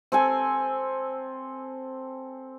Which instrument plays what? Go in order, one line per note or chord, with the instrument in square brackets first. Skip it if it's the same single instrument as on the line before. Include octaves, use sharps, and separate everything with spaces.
[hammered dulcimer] C4 A4 G#5